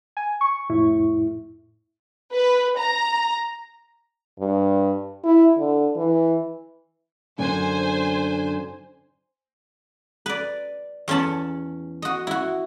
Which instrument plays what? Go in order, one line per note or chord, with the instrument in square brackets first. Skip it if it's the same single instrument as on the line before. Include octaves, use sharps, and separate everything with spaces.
[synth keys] G#5
C#6
[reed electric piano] F2 A2 E4
[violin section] B4
A#5
[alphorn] G2
E4
D3
E3
[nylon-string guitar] F#2 D3 [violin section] C5 G#5
[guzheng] B4 D5
E2 C#4 C#5 A5 B5
F#4 D#5
E4 F#4